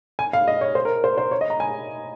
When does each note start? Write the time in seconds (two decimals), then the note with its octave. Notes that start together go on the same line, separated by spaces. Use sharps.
0.19 G#5
0.33 F5
0.48 D#5
0.61 C#5
0.75 C5
0.85 A#4
1.04 C5
1.18 C5
1.31 C#5
1.41 D#5
1.50 A#5
1.60 G#5